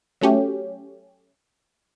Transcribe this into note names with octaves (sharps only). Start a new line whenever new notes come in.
F#3 A3 C#4 G4